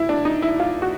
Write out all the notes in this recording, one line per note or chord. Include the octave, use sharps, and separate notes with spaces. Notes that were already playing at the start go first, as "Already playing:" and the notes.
Already playing: E4
D4
D#4
E4
F4
F#4